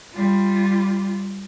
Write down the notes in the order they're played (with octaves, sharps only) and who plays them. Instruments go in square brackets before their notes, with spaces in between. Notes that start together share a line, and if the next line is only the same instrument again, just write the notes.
[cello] G3 F4